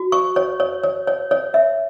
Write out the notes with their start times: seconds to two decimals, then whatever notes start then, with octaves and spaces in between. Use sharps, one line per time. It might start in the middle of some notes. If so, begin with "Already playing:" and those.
Already playing: F#4
0.12 C#6
0.36 C#5
0.60 C#5
0.83 C#5
1.07 C#5
1.31 C#5
1.54 E5